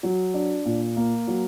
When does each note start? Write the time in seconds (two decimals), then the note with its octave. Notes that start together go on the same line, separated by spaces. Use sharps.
0.03 F#3
0.34 D4
0.65 A#2
0.97 A#3
1.28 F#3